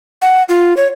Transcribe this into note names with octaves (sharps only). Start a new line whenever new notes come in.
F#5
F4
C#5